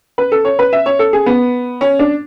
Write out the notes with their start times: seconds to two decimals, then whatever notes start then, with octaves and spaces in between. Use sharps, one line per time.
0.18 B4
0.32 A4
0.45 C#5
0.59 B4
0.73 E5
0.86 C#5
0.99 A4
1.13 G#4
1.26 B3
1.81 C#4
1.99 D4